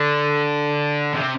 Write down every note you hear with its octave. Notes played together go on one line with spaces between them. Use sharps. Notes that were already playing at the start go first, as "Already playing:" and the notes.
Already playing: D3
C3